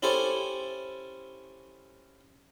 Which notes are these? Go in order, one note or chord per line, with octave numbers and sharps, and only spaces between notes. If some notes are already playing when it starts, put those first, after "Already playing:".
C#4 E4 G4 A4 C5